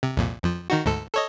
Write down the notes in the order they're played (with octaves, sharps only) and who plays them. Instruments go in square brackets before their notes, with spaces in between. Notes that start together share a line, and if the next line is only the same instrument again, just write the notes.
[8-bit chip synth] C3
C2 F2 A#2
F2 F3
D#3 D#4 F#4
D2 G#2 A4
A4 C#5 D#5